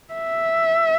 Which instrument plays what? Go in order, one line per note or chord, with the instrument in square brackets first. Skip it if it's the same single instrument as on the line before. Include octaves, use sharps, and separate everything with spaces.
[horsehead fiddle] E5